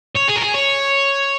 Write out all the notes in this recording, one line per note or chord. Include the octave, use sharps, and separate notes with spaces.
C#5
G#4
A#4
G#4
C#5